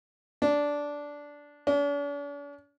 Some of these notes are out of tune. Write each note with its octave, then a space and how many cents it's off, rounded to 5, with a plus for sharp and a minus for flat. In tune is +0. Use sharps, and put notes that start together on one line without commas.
D4 -10
D4 -45